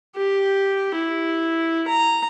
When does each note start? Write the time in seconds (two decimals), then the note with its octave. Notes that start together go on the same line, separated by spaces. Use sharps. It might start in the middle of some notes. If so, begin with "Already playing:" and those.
0.16 G4
0.95 E4
1.88 A#5